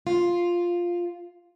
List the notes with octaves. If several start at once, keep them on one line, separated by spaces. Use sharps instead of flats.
F4